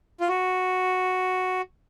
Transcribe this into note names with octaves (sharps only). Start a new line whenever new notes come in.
F4
F#4